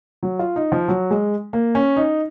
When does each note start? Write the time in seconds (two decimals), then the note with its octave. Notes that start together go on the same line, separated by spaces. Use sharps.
0.23 F#3
0.39 F4
0.56 D#4
0.72 F3
0.88 F#3
1.10 G#3
1.53 A#3
1.75 C#4
1.96 D#4